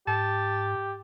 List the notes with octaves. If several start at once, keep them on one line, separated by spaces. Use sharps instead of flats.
G#2 G4 A5